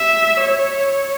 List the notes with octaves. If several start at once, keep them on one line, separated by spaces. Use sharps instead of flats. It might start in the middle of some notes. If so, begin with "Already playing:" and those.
Already playing: E5
C#5